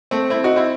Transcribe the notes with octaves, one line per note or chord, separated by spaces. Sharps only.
A3 C4
C4 E4
D#4 F#4
C4 E4